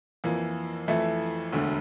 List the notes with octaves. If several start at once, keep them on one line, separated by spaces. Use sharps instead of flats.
F2 E3 A#3
F2 E3 A3 E4
E1 D2 D3 A3